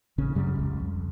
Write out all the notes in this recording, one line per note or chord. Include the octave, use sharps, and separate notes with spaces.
A1 C#3 C#4
F#2 C#3 G3
F1 C#2
F2